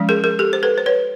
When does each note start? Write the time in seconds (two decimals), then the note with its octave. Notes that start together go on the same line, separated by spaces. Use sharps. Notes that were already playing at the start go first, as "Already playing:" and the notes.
Already playing: F3 G#3 C#4
0.09 G#4 A#4
0.24 G#4 A#4
0.39 G4 A4
0.53 C5
0.63 A4 B4
0.78 C5
0.86 B4 C#5